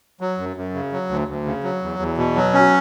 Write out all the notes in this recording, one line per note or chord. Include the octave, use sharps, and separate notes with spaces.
F#3
F#2
F#2
C#3
F#3
D2
D2
C#3
F#3
E2
E2
B2
F#3
C#4